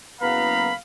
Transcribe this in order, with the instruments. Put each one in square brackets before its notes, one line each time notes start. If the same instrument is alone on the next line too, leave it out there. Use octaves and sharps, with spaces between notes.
[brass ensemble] F#1 B3 A#5 [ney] B4 [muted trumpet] F5 [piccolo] B5